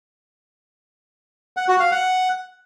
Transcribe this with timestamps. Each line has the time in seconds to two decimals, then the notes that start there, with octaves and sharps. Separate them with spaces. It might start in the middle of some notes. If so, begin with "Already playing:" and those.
1.57 F#5
1.68 F#4
1.80 F5
1.91 F#5